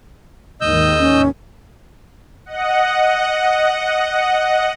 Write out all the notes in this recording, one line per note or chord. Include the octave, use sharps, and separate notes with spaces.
D#2 G#2 D#3 D#5 E6 G6
C#4
D#5 F#5